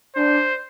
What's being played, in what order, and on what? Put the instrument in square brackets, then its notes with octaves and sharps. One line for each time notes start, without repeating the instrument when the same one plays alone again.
[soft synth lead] D4 [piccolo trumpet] C5